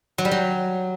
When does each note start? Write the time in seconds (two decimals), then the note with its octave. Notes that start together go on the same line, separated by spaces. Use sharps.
0.18 F#3
0.25 G3
0.31 F#3